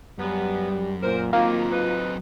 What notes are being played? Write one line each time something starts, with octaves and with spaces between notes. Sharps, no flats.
F#2 G3 B3
A#2 A#4 C5
D#3 F#3 A#3 C4 F4
D#4 B4